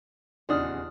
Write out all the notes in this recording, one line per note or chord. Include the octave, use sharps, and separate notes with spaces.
D#1 E2 C#3 D4 D#4 F4 D#6 F6